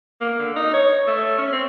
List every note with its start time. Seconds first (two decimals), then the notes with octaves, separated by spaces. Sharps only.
0.21 A#3
0.39 D3
0.56 D#4
0.73 C#5
1.07 A3
1.38 C#4
1.52 C4